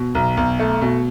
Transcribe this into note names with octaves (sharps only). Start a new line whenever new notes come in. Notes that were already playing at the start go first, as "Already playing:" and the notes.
Already playing: B2
B1
B1
A3
B2